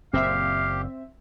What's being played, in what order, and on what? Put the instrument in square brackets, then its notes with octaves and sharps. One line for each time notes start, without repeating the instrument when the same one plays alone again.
[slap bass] F#1 A#2 [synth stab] C4 E5 [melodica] G4 [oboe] F5